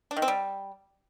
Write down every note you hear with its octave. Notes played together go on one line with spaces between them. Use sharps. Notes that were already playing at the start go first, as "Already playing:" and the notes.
D4
D#3
C4
G3